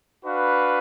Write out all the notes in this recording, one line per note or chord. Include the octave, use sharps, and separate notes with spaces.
D4 F#4 B4 F5